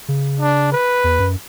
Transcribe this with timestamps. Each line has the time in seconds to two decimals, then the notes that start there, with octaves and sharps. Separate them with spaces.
0.08 C#3
0.40 D4
0.72 B4
1.04 E2
1.19 F#2